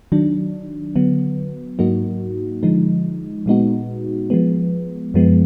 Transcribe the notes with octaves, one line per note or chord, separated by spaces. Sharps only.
D#3 F#3 D4
D3 F#3 B3
G#2 F#3 A#3 D#4 F#4
D3 F3 G#3 D#4
A#2 G#3 B3 D#4 F#4
F3 G#3 B3
F#2 F3 G#3 B3